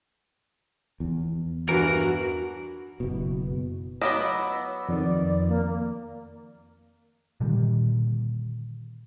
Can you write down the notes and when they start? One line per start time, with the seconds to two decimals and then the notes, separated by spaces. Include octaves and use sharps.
1.00 E2
1.69 G2 E3 F#4 A#4
3.00 F#1 B2
4.01 F#3 B3 D#5 B5 D6 E6
4.89 F2 D#3 D5
5.48 A#3
7.40 A#2 D3 D#3 G3